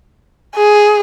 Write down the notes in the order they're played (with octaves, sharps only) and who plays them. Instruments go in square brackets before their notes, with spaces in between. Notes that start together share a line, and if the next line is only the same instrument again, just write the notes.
[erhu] G#4